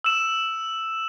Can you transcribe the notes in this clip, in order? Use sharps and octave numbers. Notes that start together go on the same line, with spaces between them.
E6 E7